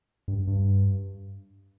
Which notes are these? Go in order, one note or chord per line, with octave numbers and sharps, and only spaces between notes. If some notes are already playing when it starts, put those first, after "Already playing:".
G2
G2